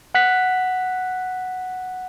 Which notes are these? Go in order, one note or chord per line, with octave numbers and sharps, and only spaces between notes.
F#5 F#6 B6